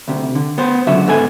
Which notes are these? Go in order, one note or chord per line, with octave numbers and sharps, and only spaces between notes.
D2 C3
D3
B3 C5
C#2 F#2 D3 F#4 E5
G#2 B3 A4 G#5